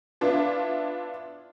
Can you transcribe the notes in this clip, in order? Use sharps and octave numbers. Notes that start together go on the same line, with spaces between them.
B3 D4 E4 F4